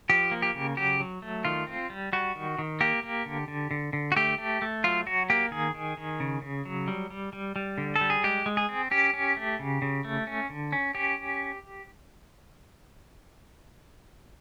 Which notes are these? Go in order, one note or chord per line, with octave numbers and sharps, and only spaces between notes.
F3 G4
A#3
G4
C#3
F#3 G4
F#3
A3
D#3 F4
C4
G3
G3 F#4
D#3
D#3
A#3 G4
A#3
D3
D3
D3
D3
F#4
A3 G4
A3
A3
F#3 F4
F#3 F#4
A#3 G4
D#3 G#4
D#3
D#3
C#3
C#3
F#3
G3
G3
G3
G3
D3
A4
G3
G#4
G#3 G4
G#3
G#4
C4
C#4 G4
C#4
A3
C#3
C#3
A3
C#4
D3
C#4
C#4 G4